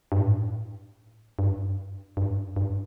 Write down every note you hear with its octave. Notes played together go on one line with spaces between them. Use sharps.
G2
A2
G2
G2
G2